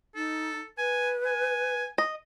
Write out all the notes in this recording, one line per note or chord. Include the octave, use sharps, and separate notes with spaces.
D#4 A4
B4 G#5
G#5
D#5